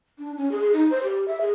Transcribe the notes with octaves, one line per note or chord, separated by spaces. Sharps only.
D4
C#4
G#4
D#4
C5
G4
E5
G#4